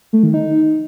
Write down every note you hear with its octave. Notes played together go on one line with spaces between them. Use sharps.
A3
D#3
D#4